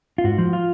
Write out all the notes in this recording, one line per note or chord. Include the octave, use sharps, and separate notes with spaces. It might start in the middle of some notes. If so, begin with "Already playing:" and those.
F4
G#2 F#4
F3
F4